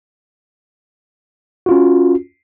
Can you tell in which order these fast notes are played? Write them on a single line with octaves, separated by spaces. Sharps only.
F#4 F4 C#4